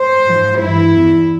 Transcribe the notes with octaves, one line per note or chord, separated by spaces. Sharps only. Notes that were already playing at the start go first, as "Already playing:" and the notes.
Already playing: C5
G#2 F3
G2 E3 E4
E2 E3